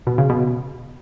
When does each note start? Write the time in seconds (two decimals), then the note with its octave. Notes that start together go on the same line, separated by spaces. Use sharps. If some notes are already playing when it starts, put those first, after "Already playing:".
0.07 B2
0.18 C#3
0.30 B2